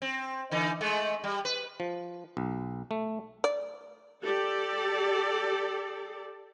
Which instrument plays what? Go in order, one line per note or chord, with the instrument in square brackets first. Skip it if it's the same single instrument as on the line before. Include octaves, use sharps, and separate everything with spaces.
[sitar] C4
D3 E3 D#4
G#3 A3
G3
B4
[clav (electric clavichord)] F3
B1
A3
[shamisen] D5
[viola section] G4 A4 D5